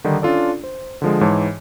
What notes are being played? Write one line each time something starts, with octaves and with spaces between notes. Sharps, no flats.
D3 D#3 G3 D#4
C#4 D4 F4 A4 D5
C5
D3 F3 G#3
G#2 E3 C#5 A5